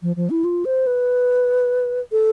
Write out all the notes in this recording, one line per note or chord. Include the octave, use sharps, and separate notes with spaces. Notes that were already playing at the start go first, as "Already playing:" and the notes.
F3
F3
E4
F4
C5
B4
A4